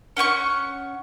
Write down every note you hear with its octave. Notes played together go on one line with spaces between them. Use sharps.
C#4 F#5 G5 C#6